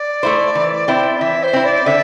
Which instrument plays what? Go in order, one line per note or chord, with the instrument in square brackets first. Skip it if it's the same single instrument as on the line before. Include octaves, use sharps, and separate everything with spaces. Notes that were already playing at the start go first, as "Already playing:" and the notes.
Already playing: [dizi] D5
[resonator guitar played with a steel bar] A3 E4 C5
E3
C4 E4
[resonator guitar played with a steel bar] E3 [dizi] E5
[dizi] C5
[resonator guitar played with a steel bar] C4 E4
[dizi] D5
[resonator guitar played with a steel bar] D3 [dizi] E5